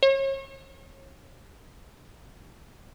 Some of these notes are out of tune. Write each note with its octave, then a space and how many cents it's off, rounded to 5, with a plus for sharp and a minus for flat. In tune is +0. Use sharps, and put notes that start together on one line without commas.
C#5 -40